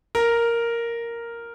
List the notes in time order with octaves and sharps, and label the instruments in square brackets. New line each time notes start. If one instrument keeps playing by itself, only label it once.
[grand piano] A#4